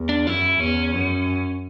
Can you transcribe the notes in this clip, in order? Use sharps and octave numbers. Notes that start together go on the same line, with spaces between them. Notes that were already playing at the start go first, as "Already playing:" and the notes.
Already playing: E2
D4
F#2 E4
E2 C#4
F#2